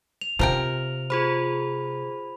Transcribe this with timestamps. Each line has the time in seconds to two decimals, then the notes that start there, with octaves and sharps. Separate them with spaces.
0.21 F7
0.39 C3 F3 A#4 G5
1.10 F4 G#4 C5 B5